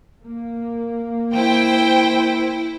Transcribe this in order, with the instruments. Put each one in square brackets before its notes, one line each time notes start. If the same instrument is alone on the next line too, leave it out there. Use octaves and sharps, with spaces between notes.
[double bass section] A#3
[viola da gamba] E4 [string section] C5 G5